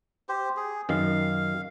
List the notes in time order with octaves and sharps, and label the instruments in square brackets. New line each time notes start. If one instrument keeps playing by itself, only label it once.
[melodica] G4 C5
G#4
[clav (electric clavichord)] F#2 D#3 [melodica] F5